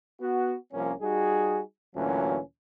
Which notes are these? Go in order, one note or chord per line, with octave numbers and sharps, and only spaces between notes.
B3 F#4
C2 F3 A#3 C#4
G3 D#4 F#4 G#4
D2 A#2 E3 F#3 C#4